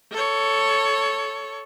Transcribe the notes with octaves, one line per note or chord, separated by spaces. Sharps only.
A4 C#5